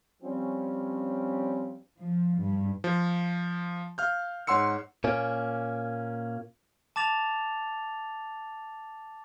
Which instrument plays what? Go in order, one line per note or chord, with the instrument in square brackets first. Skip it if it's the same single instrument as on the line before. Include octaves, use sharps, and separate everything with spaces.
[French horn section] F3 G3 C4 C#4
[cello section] F3
G2
[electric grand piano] F3
F5 F6 G6
G#2 C#5 F#5 C6 E6 C#7
[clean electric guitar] A#2 A#3 C#4
[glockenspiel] A5 D6 A6 F7